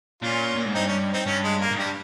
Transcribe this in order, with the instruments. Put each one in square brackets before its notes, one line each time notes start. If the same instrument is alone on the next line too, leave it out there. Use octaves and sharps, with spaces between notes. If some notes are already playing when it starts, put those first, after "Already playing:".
[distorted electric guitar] A#2 [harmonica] C#4 F4
[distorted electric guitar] A#2
G#2
[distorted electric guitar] G2 [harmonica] C4 D#4
[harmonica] C#4
C4 D#4
[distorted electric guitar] G2 [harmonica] C#4
[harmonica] G#3
A#3
[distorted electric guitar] G#2
[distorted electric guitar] G2 [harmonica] G3